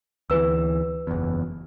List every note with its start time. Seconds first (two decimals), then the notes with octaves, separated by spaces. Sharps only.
0.30 D2 E3 B4 E6
1.07 F#1 E2